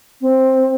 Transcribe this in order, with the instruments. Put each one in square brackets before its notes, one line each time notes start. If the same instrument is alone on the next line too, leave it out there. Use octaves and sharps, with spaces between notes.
[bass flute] C4